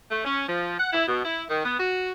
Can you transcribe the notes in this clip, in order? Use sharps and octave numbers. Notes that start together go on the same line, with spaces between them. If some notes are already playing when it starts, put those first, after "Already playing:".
A3
C#4
F3
F#5
E4
B2
E4
D#3
B3
F#4